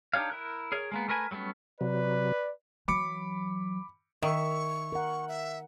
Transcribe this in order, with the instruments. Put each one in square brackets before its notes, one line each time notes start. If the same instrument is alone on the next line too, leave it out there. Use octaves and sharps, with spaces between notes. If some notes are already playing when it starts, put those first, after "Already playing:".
[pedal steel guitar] D4 D#4 G4 C#5 F5
E4 A#4 F#6
G#4 A#4 C#5
G#3 A#3 B3
A3 A#4 B4 G#5
F#3 G3 A3 B3 C#4
[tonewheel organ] C3 F#3 [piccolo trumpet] B4 [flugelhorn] D5
[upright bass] E3 F#3 [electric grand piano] B5 D6 C#7
[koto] D#3 [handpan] E5 [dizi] C#6
[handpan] A#4 F#5
[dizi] E5